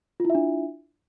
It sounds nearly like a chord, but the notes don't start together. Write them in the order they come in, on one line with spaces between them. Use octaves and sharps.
F4 E4 E5 D4